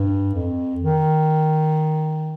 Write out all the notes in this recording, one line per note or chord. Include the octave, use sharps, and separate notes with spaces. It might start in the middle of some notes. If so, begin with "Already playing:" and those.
Already playing: G2
F2
D#3